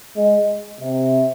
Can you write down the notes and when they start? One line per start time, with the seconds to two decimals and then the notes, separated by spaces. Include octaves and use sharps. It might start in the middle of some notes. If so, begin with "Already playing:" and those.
0.16 G#3
0.81 C3